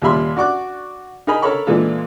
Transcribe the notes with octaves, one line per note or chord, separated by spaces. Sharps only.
D#2 A#2 G3 E5 B5 C6
F#4 D5 C#6 D6 F#6
D#4 G#4 A#4 D#5 G#5 B5
A4 A#4 C#5 B5 C#6
A#2 E3 G#3 D4 F4 A4